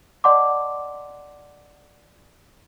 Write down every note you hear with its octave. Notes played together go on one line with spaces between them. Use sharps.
D5 D#5 F#5 A5 C6 D6